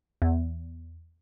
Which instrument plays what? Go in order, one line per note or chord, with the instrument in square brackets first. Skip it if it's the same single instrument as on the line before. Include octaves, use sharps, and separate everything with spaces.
[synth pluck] E2